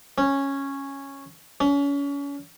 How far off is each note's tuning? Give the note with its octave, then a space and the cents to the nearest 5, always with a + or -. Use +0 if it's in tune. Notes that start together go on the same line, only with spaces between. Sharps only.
C#4 -10
C#4 +30